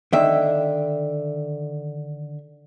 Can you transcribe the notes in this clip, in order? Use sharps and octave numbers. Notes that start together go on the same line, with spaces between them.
D3 D#3 E5